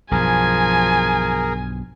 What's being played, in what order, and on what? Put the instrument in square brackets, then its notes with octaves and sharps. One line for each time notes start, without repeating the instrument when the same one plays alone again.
[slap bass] B1 G2 B2 [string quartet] F3 [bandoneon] G#4 A#4 [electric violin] G#5